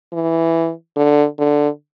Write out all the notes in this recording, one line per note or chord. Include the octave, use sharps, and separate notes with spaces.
E3
D3
D3